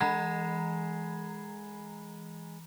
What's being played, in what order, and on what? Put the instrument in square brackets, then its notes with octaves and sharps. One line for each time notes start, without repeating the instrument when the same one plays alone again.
[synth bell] E3 A#5 B5 [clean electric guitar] G#3 [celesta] F#5